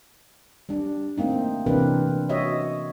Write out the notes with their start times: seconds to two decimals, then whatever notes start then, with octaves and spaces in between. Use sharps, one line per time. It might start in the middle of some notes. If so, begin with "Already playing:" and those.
0.69 G3 D4
1.18 A3 A#3 C4 D#4
1.66 C3 E3 C4 D4 A#4 B4
2.29 F#4 C#5 D#5 E5